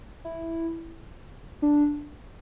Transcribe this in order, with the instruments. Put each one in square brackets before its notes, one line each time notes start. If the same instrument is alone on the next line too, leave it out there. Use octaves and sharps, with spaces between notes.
[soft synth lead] E4
D4